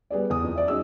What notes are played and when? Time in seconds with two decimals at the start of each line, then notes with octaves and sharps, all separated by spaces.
0.10 G3 B3 G#4 D5
0.30 E2 D#6
0.44 F2
0.55 D5 E5
0.68 F#3 C#4 D#4 F#4 G#4 E6